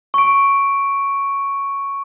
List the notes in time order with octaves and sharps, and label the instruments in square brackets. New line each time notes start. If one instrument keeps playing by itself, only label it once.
[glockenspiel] C#6 D7